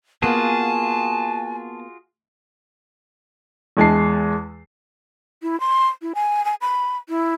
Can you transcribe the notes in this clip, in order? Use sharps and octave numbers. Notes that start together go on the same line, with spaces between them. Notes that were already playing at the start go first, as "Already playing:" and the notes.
A#3 B3 F4 F#4 G#4 G#5 A5
E2 G#3 A5 C7
E4
C6
E4
G#5
G#5
B5
E4